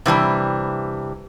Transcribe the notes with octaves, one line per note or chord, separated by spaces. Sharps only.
C3 E3 G3 D4